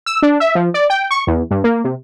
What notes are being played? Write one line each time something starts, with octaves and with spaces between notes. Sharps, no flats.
E6
D4
E5
F3
D5
G5
C#6
E2
G2
A#3
C3